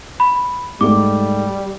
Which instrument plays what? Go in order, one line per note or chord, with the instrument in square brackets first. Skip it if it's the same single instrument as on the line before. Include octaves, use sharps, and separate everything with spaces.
[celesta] B5
[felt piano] G#2 A3 [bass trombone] G3 [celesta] D6